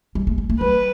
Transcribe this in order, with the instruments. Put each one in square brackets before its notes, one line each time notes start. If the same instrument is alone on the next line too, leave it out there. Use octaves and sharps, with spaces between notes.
[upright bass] G3
A3
G3
A3
[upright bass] G3 [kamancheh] B4